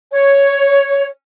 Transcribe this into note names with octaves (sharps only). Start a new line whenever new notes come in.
C#5